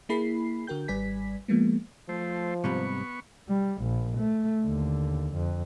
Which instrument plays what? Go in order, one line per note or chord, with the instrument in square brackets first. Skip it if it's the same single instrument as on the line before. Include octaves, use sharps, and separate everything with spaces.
[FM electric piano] A#3 E4 G#4 B5 C7
D3 F#4 A#4 G5 G6
G#1 G3 B4 D5 G#5 B6
F3 G#3 A#3 B3
[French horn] F3 [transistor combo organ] A3 C5
[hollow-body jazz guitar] G#2 C3 G3 [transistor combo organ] B3 C#6
[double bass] G3
A#1
A3
D#2 D3
F2